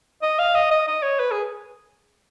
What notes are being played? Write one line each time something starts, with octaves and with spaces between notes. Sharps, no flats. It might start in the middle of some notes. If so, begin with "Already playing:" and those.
D#5
F5
D#5
D#5
D#5
C#5
B4
G#4